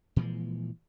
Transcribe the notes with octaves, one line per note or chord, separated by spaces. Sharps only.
A#2 E3 F3 G#3